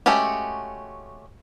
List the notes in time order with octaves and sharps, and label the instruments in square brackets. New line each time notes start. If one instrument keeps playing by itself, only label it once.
[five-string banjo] G#3 A3 C#4 F#4 G4